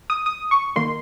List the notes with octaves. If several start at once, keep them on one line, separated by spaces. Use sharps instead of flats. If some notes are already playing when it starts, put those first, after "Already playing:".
D#6
D#6
C#6
D#3 A#3 D#4 C6